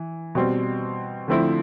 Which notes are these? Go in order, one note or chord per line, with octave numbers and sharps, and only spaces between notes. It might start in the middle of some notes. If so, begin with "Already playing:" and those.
Already playing: E3
B2 G3 C4
D3 F3 A3 C4 E4